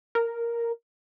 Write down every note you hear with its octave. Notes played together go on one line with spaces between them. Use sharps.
A#4